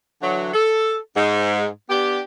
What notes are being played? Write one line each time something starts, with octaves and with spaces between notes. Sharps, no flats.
D3 E3 F#3
A4
G#2
B3 D4 G4